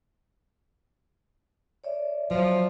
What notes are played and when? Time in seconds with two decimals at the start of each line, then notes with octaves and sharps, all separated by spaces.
1.84 C#5 D5 E5
2.31 F3 F#3